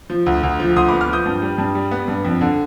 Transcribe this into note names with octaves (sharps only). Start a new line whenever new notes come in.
F3
D2
D2
F3
D2 C6 D#6
B5 D6
B3
D6 F6
F3 D#6 G6
G2
G3
G2
G3
B3
G2
F2
D3